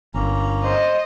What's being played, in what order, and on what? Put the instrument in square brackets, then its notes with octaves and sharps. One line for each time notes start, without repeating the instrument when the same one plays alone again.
[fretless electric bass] G1 [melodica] A#3 C#4 A#5
[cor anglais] C5 [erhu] D#5